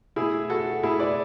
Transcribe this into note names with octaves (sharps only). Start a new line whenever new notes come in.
B2 A3 E4 G#4
F#4 A4
B2 A3 E4 G#4
B4 D5